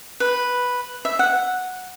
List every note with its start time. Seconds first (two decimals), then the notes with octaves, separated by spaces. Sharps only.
0.20 B4
1.05 E5
1.19 F#5